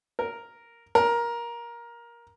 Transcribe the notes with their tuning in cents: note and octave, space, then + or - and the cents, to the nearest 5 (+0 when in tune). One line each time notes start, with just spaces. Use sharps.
A#4 +0
A#4 +15